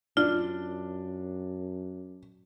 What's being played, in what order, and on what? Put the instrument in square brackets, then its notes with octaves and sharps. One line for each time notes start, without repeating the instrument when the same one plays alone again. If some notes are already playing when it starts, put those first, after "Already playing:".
[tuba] F#2 [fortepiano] D4 [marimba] F4